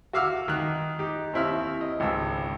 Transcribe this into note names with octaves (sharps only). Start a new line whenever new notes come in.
F#4 E5 F5 D6 E6 F6
D#3 F#6
D#4 G4
D#2 C4 E4 E5 F6
D#5
G#1 C#2 E6